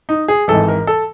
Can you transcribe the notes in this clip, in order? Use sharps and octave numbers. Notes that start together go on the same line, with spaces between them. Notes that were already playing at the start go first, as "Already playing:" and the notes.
D#4
G#4
G#1 G#2 E3 A4
A#4
A4